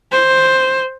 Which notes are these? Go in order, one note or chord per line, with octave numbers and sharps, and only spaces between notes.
C5